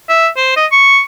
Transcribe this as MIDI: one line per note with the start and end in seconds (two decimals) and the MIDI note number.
0.09 0.28 76
0.37 0.52 72
0.57 0.66 75
0.72 1.00 85